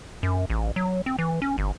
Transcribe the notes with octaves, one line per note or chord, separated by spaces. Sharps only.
F#2
A1
F#3
C4
E3
C#4
G1